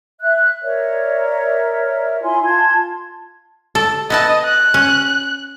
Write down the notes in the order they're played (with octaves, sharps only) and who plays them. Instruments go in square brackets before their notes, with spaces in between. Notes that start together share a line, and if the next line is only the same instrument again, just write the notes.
[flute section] E5 F#6
A#4 C#5 D5 E5
E4 F4 G#5 C6
F4 A5 C6 G#6
[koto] A4
[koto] B3 E4 A5 [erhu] D#5
[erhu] F#6
[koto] C#4